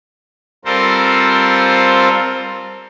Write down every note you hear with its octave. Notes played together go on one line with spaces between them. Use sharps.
G3 C4 F4 A4 A#4 C5